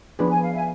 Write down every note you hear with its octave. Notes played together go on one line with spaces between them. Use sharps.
F3 B3 D4 G#4 B4
G#5
F5
E5 G#5